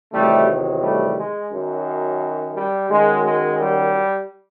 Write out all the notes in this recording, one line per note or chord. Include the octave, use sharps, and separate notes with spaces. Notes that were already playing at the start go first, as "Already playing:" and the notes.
E2 C3 D#3 F#3 G3 A3
G3 A3
G#3
F#2 D#3 F#3
G3
F#2 D#3 F#3 G#3
G#3
G3